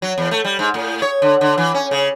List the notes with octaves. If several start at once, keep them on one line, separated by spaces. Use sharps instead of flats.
F#3
E2
A3
G3
G#2
A2
C#5
D3
D3
E3
C#4
C#3